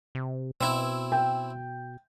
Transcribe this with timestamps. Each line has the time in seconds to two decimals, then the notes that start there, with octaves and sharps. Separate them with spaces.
0.15 C3
0.61 B2 C4 E4
1.12 G5